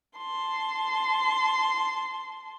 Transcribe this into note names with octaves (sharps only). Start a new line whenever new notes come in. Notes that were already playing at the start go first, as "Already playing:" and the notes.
A5 C6